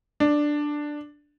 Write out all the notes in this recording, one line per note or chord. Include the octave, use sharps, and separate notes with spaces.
D4